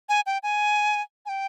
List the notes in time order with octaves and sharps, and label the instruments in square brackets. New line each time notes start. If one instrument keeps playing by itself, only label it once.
[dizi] G#5
G5
G#5
G#5
G5